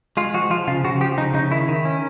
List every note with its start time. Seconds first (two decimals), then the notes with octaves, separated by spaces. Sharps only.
0.17 G#3 F4
0.34 F3 F#4
0.50 F3 F4
0.67 C#3 F4
0.84 C#3 F#4
1.00 F3 G4
1.17 C#3 D#4
1.34 C#3 D#4
1.51 D#3 E4
1.68 D#3
1.85 C#4